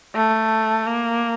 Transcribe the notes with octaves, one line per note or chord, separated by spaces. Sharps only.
A3
A#3